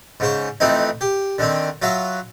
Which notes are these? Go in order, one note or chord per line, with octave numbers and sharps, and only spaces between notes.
G#2 C#3 C5 C#6
F2 E3 A3 C4 D#4
G4
D3 D#3 C4
F#3 F4 F#4 E5 F5